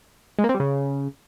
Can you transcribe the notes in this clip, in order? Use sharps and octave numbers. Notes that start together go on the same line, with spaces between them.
G#3
A#3
C4
G3
C#3